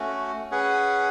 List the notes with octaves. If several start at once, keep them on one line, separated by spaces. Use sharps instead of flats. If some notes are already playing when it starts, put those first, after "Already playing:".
Already playing: A3 C#4 F#4
C#4 G#4 B4 F#5